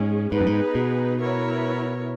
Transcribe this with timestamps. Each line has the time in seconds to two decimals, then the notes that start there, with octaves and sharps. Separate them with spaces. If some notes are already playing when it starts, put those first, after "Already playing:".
Already playing: G#2 G#3 C#4 G#4
0.31 G#2 B3 D#4 G#4 B4
0.41 F#2
0.47 G#2
0.75 B2
1.19 B3 E4 A#4 C#5